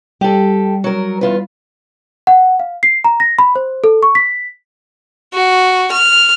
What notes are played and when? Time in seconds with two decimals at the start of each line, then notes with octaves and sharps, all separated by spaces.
0.21 G3 G4 A4
0.84 F#3 A#4
1.21 E2 F4 B4
2.27 F#5
2.60 F5
2.83 C7
3.04 A#5
3.20 A#6
3.39 B5
3.55 C5
3.84 A4
4.03 C#6
4.15 B6
5.34 F#4
5.92 F6